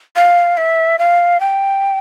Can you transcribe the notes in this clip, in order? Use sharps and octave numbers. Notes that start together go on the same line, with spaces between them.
F5
E5
F5
G5